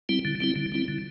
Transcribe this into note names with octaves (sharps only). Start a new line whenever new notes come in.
G3 C4 E4
D3
G3 C4 E4
D3
G3 C4 E4
D3